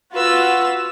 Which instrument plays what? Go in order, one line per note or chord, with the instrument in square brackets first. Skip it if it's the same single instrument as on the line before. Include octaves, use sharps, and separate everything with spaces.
[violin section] F4 F#4 [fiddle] B4 E6